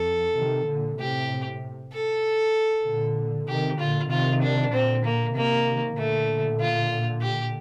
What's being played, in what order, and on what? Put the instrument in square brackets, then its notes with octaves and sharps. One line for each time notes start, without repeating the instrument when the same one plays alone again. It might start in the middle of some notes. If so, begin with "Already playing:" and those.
Already playing: [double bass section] F2 [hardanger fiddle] A4
[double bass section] C3 D#3
A#2 D3
[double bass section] A2 C3 [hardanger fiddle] G4
[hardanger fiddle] A4
[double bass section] A#2 D3
[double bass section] C3 D#3 [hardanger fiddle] G4
[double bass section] A#2 D3 [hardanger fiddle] F4
[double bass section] C3 D#3 [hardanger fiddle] F4
[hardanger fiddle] D4
[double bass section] A#2 D3 [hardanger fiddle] C4
[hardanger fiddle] A#3
[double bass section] C3 D#3 [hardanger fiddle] A#3
[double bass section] A#2 D3 [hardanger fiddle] A3
[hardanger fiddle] F4
G4